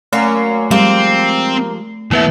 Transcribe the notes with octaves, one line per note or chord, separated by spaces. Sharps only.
F#3 A3 A#3 C#4 C7
F3 G3 G#3 A#3 C4
D#2 E3 A3 B3 E4 B4 E5